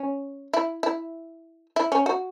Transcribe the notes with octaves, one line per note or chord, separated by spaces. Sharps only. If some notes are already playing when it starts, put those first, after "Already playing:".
Already playing: C#4
E4
E4
E4
C#4
F#4